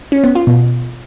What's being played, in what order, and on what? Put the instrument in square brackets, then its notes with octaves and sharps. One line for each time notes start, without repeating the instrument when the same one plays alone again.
[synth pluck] C#4
B3
F4
B2